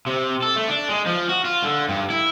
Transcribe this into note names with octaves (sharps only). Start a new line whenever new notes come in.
C3
A4
A3
D4
G#3
F3
F#4
F4
D3
G2
E4